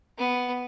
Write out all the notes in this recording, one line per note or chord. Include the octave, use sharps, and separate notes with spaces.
B3